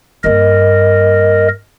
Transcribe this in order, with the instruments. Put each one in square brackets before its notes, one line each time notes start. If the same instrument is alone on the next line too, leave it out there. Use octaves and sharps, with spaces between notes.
[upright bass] G2 A#3 [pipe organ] A#4 D#5